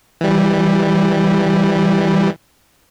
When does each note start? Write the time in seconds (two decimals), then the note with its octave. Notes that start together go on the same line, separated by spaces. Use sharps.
0.21 E3 G3